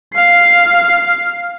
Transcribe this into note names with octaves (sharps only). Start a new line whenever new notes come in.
F5 C7